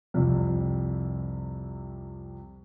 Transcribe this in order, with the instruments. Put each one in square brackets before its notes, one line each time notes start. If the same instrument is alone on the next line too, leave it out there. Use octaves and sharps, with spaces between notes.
[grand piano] C2 F2 C3